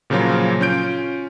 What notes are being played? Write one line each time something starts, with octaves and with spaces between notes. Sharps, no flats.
A#2 C#3 F3 F#3 A#3 F4
C#4 F4 G6 D7